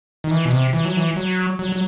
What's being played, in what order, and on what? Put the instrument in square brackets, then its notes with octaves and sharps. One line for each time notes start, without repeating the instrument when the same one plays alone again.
[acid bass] D#3
E3
B2
C3
E3
F#3
E3
F#3
F#3
F#3